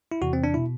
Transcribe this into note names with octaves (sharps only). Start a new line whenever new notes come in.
E4
E2 C3 E3 F#4
C4
D4
B2 E4